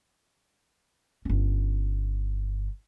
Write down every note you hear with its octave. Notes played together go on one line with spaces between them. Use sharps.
G1 C#4